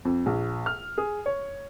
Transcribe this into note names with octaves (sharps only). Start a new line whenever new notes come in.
F2
A#1
F6
G#4
C#5